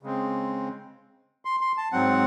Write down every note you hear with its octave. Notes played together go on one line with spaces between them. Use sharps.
C#3 G#3 C4
C6
C6
A5
G#2 F#3 C4 F#5